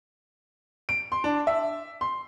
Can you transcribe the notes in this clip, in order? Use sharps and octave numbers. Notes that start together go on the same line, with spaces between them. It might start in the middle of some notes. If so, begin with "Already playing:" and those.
D7
C6
D4
E5
C6